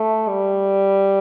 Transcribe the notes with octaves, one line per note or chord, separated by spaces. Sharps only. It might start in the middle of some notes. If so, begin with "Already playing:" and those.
Already playing: A3
G3